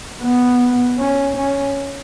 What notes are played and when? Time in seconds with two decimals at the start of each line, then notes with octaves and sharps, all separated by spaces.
0.23 B3
0.99 C#4
1.37 C#4